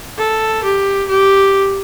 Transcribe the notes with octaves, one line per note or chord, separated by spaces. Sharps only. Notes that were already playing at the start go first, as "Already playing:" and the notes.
A4
G4
G4